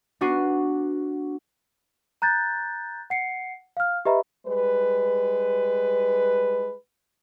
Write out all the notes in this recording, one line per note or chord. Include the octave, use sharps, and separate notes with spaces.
B3 D4 F#4 F#6 C7 D#7
A#5 F#6 G6 A6
F#5 C7 C#7
F5 F6
G4 B4 D#5 E5 A#5 B5
G3 G#3 B4